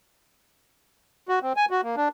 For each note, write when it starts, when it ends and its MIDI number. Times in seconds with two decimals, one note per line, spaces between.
1.29 1.39 66
1.42 1.53 60
1.57 1.65 80
1.71 1.81 66
1.83 1.96 58
1.97 2.08 62